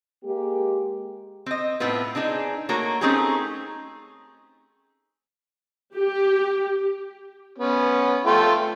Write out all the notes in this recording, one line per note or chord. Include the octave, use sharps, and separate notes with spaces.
G#3 A#3 G4
C4 D#5
A2 B3 C4 F4 B4
C4 D4 D#4 G#4
A3 A#3 F#4 A#4 C#5
A3 C4 C#4 D#4 G4 G#4
G4
B3 C#4
A3 F4 G5